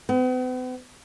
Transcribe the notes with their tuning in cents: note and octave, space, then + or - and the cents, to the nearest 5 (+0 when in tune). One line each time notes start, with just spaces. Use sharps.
B3 +45